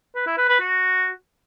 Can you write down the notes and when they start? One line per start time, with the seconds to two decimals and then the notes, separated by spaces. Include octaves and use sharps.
0.15 B4
0.26 E4
0.38 B4
0.49 B4
0.60 F#4